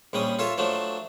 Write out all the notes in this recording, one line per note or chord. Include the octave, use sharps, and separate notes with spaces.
A#1 G3 C#4 D#6
F4 A4 C#5 E5
F3 F#3 A3 D4